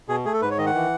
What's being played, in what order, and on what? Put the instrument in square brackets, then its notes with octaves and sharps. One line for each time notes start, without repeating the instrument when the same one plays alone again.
[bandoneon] B2 G#4
A3 G#4
A4
G#2 B4
C#5
D#3 D#5
F#5
E3